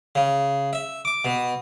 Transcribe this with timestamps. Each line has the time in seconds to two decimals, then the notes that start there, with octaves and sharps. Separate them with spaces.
0.15 C#3
0.73 E5
1.05 D6
1.25 B2